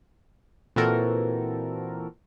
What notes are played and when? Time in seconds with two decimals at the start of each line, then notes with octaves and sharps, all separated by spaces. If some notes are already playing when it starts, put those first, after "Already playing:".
0.76 A#2 E3 C4 F#4 A4 A#4